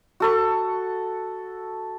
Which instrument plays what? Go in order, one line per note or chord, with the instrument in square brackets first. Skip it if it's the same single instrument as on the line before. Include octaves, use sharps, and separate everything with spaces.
[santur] F#4 A4 C#6